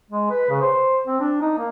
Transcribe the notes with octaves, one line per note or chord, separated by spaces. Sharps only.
G#3
B4
C#3
C5
C4
D4
D#4
A#3